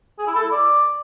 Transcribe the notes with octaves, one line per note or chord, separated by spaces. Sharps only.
G#4
E4
A4
E4
D5